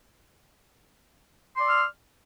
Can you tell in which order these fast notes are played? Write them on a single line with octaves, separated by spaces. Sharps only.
C6 D5 E6 F6